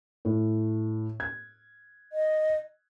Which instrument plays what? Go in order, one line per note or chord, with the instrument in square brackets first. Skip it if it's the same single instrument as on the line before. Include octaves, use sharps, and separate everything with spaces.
[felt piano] A2
G#6
[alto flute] D#5